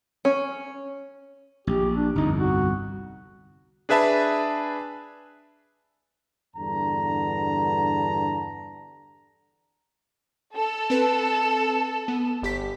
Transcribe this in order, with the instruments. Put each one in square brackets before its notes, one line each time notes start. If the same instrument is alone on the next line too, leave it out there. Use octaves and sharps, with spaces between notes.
[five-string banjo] C#4
[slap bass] A#1 [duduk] G4
[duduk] D4
[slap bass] G1 C2 F2 [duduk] D#4
[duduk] F#4
[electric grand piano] D4 G#4 B4 E5 A5 B5
[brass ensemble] E2 G2 D3 B3 A5 A#5
[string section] A4
[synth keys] C4 B4
B3
G1 G4 B6